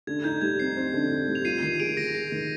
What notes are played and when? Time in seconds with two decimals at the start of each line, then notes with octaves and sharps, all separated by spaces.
0.07 D3 G#6
0.24 D#4 G6
0.41 G3 G#6
0.60 C4 C7
0.77 C4
0.94 D3
1.11 D#4
1.28 G3
1.35 F7
1.45 F4 C7 D#7
1.62 D#3 C7 D#7
1.80 G#4 D7 F7
1.97 D#3 A#6 D7
2.07 D7
2.14 G#4 C7
2.32 D#3